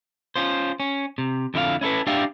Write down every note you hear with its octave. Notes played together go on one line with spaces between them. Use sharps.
C#4 F4 C5
C#4
C3
F2 D3 E4 F#4 F5
C#4 E4 A4 B4
D4 G4 D5 E5 F5 G5